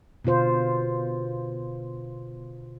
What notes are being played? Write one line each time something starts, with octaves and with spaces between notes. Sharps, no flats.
B2 D3 F4 C5